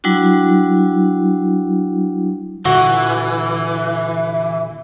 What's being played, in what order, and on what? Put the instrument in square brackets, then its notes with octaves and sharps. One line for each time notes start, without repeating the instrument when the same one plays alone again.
[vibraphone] F#3 G3 D4 E4 F#4
[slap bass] A#2 D3 [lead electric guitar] E3 [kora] F#4